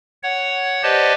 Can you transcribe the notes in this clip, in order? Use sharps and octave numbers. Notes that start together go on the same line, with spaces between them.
C#5 F#5
G4 B4 C5 D5 D#5 A5